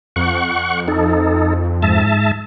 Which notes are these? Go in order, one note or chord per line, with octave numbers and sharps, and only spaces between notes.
F2 F#5 C#6
D#4 A4
G#2 E5 A5